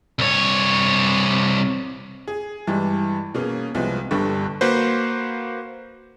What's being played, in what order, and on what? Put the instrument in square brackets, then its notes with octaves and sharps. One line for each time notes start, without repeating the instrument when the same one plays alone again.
[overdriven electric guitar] C2 C#5
[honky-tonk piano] G#4
G2 E3 G3 G#3
B2 A#3 C#4 G#4
C2 F3 G#3 B3
G1 G2 D3 G3 B4 C#6
[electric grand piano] A#3 F#4 B4 C5